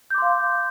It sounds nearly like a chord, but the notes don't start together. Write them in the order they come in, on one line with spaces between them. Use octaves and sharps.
G6 D6 C6 F5